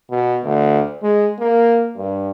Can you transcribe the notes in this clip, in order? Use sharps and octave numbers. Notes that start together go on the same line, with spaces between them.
B2
D2
G#3
A#3
G2